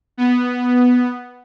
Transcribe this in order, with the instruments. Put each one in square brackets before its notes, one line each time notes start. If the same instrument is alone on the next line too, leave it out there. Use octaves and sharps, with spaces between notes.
[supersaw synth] B3